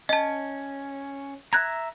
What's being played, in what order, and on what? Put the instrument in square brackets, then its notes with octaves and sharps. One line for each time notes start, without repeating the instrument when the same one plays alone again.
[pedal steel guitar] C#4 [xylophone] D#5 A5
[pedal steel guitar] E5 A#5 [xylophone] F#6 G#6 A#6